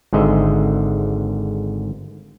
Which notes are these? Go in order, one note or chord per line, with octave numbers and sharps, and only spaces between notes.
G#1 G#2 D3 D#5 E5